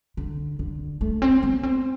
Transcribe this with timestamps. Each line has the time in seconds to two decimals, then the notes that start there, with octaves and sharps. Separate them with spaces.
0.17 D3
0.59 D3
1.01 A3
1.22 C4
1.43 B3
1.63 C4